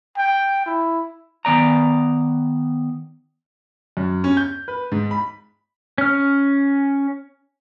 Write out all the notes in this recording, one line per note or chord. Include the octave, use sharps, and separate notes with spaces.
G5
E4
D#3 B3 D5 A#5
F#2
C#4
G6
B4
G#2
B5
C#4 F6